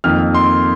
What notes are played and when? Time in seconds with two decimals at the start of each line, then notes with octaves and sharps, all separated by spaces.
0.04 F2 D#3 A#3 D#4 F6
0.34 C6